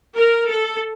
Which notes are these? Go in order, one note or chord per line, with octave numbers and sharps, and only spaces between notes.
A#4
A4